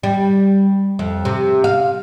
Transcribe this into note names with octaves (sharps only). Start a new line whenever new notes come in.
G3
F2
C3
F5